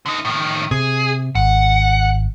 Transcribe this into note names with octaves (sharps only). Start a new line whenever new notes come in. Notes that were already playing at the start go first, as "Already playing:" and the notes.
D3 D#4
A2 D#3
C3 G#4
G#1 F#5